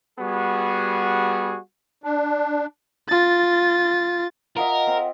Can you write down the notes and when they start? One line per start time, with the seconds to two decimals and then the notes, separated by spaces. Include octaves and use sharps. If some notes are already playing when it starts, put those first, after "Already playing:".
0.20 G3 B3 F#4 G#4
2.04 D4
3.09 F4 A6
4.57 F4 A#4 D#5 E5 F#5
4.87 C4